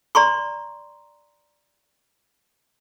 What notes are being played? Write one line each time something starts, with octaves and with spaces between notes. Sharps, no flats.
D5 A#5 C6 C#6